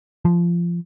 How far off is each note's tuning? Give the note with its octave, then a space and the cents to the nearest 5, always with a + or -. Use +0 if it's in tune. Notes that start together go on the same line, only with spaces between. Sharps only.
F3 -20